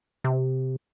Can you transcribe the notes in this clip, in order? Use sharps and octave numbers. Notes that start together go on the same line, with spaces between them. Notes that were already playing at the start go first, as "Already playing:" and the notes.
C3